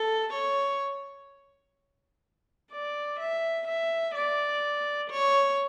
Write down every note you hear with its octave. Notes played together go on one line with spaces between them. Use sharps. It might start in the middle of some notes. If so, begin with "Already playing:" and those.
Already playing: A4
C#5
D5
E5
E5
D5
C#5